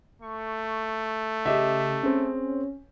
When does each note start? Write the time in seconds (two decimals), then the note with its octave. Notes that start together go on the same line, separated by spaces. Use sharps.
0.22 A3 C#6
1.46 C#3 G4 D#5 E5
2.03 C4 C#4 G#4